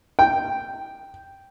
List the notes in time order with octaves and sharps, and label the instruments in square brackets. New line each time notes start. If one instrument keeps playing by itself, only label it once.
[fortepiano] G5